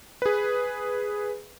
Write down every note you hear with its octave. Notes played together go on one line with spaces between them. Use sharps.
G#4 B4